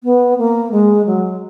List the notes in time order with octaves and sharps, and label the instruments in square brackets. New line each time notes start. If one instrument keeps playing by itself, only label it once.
[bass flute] B3
A#3
G#3
F#3